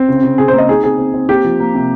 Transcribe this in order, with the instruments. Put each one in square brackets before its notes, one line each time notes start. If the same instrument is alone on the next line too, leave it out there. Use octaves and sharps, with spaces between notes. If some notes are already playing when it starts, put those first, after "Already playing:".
Already playing: [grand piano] C4
C#3
C#3
[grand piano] C#3 [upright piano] G#4
[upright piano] C5
[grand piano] A#3
[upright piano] D#5
[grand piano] D#4 [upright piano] G#4
[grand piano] C4 [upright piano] G#4
[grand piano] C4
C4
[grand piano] A#3 [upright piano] G4
[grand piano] F3
A#3
C3